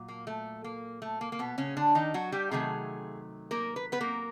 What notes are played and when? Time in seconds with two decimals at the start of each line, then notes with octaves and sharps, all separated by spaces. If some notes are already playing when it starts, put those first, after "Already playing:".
Already playing: A#2 F#3
0.08 A#3
0.27 A3
0.64 A#3
1.02 A3
1.21 A#3
1.32 A#3
1.39 B2 B3
1.58 C#3 C#4
1.77 D3 D4
1.95 D#3 D#4
2.14 F#3 F#4
2.32 G3 G4
2.52 C3 D#3 F#3 A3 G#4
3.51 A#3 A#4
3.76 B4
3.92 B3 B4
4.01 A#3 A#4